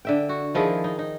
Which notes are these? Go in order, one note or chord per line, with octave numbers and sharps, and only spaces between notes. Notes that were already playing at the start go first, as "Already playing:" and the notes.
D3 E5 G5
F#4
D#3 F3 E4 G#4
D#4
D#4